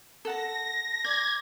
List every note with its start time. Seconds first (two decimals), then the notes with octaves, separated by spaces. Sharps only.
0.25 A4 F#5 A5 A#6
1.05 D5 G#6